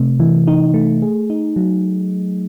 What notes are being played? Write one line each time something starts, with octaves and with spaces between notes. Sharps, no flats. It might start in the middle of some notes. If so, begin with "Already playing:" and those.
Already playing: C3 A3
E3
D#4
A3
G#4
D#4
F#3